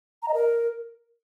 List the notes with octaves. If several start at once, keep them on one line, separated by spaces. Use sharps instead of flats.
A#5
D#5
A#4